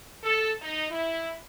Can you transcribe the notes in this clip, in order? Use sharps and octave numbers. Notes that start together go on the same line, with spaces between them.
A4
D#4
E4